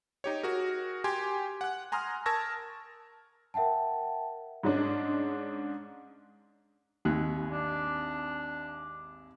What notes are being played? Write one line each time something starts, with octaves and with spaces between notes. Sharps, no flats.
D#4 G4 C#5
F#4 G#4 A#4
G4 G#5 C6 G#6
F#5 F#6
G#5 A#5 C6 D#6 F6
A#4 A5 C#6 E6 G#6 A#6
A#4 E5 F#5 G5 A5
G#2 G#3 C#4 D4
G#1 D#2 F#6
D4